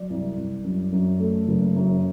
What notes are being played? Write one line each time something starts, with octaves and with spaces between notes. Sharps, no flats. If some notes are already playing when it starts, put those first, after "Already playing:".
Already playing: F#3 D5
C2
C2
F#2
F#2
A3
F#1
F#2